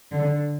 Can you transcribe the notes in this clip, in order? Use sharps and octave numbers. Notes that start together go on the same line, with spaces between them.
D3